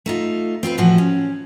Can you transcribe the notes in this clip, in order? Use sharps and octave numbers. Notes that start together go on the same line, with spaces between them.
A3 D#4 F4
C4 F4 G#4 B4
A2 E3 F3 F#4
C#4